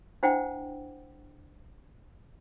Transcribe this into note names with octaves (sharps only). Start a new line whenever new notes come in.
D4 E4 C5 F#5 G5